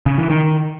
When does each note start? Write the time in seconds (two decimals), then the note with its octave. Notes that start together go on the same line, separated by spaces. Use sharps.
0.06 C#3
0.18 E3
0.30 D#3